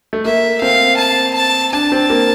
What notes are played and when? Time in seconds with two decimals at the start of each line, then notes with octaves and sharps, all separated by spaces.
0.13 A3
0.25 A#3 E5
0.62 C4 F5
0.98 A5
1.36 A5
1.73 D4 A5
1.92 C4
2.10 A#3